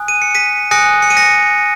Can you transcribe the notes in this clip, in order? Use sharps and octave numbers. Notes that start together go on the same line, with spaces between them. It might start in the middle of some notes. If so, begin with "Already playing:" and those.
Already playing: G#5 D#6 F#6
D#7
C#7
B6 D#7
G#5 D#6 F#6 A#6 C#7
C#7
D#7
A#6 C#7